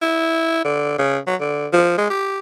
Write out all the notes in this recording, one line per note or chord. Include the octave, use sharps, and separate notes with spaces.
E4
D3
C#3
F#3
D3
F3
G#3
G4